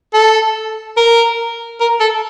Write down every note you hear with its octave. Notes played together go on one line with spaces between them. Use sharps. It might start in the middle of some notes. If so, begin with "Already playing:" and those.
A4
A#4
A#4
A4